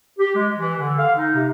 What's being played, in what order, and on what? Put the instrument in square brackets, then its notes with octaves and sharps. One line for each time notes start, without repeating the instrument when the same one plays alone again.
[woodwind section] G4
G#3
E3
D3
F5
D#4
C3